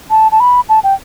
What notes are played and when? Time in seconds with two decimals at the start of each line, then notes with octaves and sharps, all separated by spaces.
0.10 A5
0.32 A5
0.40 B5
0.69 A5
0.84 G5